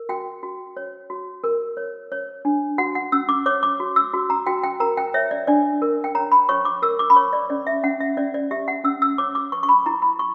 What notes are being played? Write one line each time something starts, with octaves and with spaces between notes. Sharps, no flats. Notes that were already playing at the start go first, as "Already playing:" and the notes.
Already playing: A#4
F#4 G5
F#4
C#5
F#4
A#4
C#5
C#5
D4
F#4 F#5
F#5
C#4 E6
D6
C#5 D6
D6
F#4
E6
F#4
A#5
F#4 G5
G5
A#4 A#5
G5
C#5 E5
D5
D4 D5
A#4
G5
C#5 A#5
B5
C#5 C#6
D6
A#4 E6
D6
B5
C#5 C#6
D5
C#4 D5
E5
C#4 F#5
E5
C#4 D5
D5
G4 E5
F#5
C#4 E6
E6
C#5 D6
D6
B4 C#6
C#6
B5
E4 A#5
B5
C#6